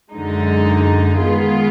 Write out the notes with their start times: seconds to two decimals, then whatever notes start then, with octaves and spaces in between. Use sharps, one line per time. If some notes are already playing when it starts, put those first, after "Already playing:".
0.12 F#2 D3 G#3 D#4
1.18 D#3 G#3 B3 F4 G#4